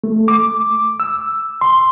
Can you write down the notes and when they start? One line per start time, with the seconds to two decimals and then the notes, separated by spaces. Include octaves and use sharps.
0.04 A3
0.28 D6
1.00 E6
1.61 C6